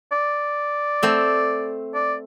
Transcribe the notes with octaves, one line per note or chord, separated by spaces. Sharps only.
D5
A3 C4
D5